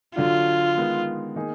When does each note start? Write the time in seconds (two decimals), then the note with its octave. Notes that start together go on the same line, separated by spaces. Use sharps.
0.16 D3 F#3 D4 F4
0.77 D#3 G#3 B3
1.36 D#3 A#3 D#4 G#4